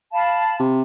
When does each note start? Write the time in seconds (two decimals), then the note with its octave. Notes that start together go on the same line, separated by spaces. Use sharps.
0.13 F5 A5 B5
0.60 C3